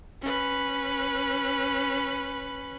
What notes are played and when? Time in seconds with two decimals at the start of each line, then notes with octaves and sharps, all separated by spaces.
0.22 C#4 B4